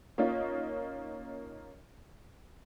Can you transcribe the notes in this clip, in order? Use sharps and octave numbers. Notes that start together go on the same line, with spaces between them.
A#3 C#4 D#4 F4